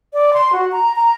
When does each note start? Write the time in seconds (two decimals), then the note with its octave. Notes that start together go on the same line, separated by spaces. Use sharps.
0.14 D5
0.34 C6
0.53 F#4
0.72 A#5
0.96 A#5